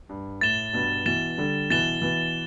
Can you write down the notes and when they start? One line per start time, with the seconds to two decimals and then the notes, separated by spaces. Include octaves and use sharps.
0.09 G2
0.41 A2 A6 E7 G7
0.73 G2 B2
1.06 B2 E3 A6 E7 G7
1.38 D3 G3
1.70 B2 E3 A6 E7 G7
2.02 B2 E3